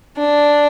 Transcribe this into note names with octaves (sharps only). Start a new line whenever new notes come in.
D4